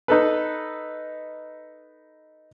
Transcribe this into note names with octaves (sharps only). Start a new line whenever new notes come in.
D#4 A4 B4